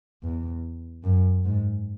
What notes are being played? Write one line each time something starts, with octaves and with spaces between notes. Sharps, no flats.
E2
F#2
G#2